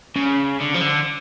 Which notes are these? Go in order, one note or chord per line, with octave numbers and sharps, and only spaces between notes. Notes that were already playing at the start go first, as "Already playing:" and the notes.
C#3
D3
F3
D3